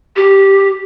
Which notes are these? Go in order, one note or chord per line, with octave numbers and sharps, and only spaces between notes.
G4